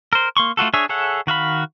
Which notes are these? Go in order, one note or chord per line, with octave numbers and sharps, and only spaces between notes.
A#4 C5
A#3 C6 C#6
A3 F4 F#4 A4
D4 G#4 C#5 E5
G#4 A4 C#5 E5 F#5
D#3 F#4 F5 B5